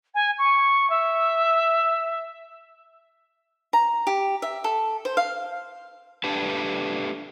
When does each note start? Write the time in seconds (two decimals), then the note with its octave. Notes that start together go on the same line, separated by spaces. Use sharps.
0.14 G#5
0.38 C#6
0.89 E5
3.73 A#5
4.07 G4
4.42 E5
4.64 A4
5.05 C5
5.17 F5
6.24 A3 D4 G4 B4 A5